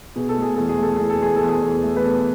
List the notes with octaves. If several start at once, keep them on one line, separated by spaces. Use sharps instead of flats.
B2 G#4
A4
A3
G#4
E2 A4
G#4
A3 A4
E2 G#4
A4
E2 G#4
E2 A4
G#4
E2
A3
B4
B2 A4